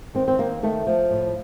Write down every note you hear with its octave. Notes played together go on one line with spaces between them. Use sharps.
D#3 C4
C4
D#3 A#3
D#3 A3
F3
A2